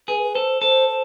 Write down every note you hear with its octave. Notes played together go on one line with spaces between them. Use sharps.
G#4 B4
B4
A4 C5
A4 C5
C5